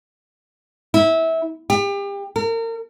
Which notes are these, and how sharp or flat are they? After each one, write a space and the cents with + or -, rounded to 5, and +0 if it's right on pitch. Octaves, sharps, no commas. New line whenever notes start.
E4 -20
G4 +35
A#4 -35